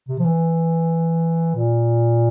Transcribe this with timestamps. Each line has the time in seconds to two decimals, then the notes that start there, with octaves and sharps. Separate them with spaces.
0.08 C3
0.19 F3
0.24 E3
1.55 A#2